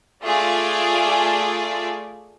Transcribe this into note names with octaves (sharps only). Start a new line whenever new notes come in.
A3 F4 G#4 D5